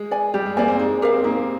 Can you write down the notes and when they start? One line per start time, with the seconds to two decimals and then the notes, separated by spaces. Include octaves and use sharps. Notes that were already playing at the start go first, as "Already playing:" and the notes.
Already playing: G#3
0.11 D5 G#5
0.34 G3 G4
0.46 G#3
0.57 A#3 D5 G#5
0.68 C4
0.79 G#3 D#4
1.02 G4 A#4 F5
1.13 C4
1.24 A#3 D#4